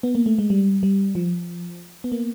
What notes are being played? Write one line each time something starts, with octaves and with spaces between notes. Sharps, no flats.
B3
A#3
A3
G#3
G3
G3
F3
B3
A#3